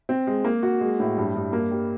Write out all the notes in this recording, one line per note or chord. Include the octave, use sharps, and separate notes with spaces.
C4
G#3
A#3
F#4
G#3
A2
G2
G2
A#3
G3